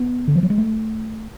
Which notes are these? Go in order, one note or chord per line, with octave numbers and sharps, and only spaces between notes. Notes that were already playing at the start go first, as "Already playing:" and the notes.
Already playing: B3
D3
F3
F#3
G#3
A3